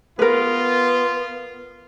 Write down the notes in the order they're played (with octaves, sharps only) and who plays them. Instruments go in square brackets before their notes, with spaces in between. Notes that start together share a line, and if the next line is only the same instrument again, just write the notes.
[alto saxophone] B3 [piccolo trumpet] F4 [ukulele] A#4 B4